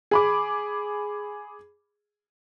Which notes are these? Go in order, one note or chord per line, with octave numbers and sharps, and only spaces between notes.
G#4 B5 D6